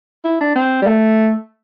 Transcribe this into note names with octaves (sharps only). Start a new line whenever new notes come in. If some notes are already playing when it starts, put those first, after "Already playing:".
E4
D4
C4
G3
A3